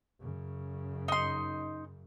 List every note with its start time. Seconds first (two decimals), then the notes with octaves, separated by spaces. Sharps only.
0.20 F#2 C#3
1.08 D#4 C6